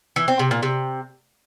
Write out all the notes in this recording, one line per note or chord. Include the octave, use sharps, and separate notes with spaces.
E3
C4
C3
A#2
C3